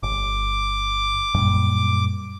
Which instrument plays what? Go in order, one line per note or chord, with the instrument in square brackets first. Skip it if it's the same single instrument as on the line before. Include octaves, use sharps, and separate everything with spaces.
[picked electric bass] G1 [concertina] D6
[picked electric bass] F#2 A#2 G3